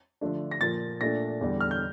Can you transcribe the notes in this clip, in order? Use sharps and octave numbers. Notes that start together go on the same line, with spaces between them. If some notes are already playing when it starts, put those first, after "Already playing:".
D3 F3 A3 D4
A#6
A#2 F3 A#3 A6
A#2 A3 D4 A#6
E2 D3 G3
F6
G6